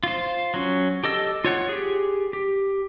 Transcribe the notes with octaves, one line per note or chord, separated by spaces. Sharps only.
F4 C5
F#3 C#4
G4 A4 D#5 E6
F4 C#5 F#5
G4 G#4
G4